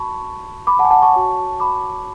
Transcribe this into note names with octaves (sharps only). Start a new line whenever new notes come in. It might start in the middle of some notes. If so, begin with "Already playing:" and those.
Already playing: F#4 A5 B5 C#6
B5 D6
F#5 A5
G#5
F#5 A5
A5 C#6
F#4 C#5
B5 D6